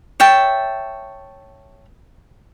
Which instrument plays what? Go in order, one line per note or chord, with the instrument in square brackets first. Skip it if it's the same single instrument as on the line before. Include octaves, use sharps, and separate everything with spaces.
[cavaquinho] C#5 E5 G5 A5